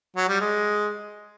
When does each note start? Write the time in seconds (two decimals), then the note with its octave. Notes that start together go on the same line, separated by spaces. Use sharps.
0.16 F#3
0.28 G3
0.40 G#3